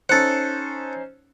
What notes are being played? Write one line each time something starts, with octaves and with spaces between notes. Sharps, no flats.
C#4 D#4 A4 C5 F#5